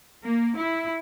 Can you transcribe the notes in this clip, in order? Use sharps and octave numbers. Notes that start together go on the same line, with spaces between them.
A#3
E4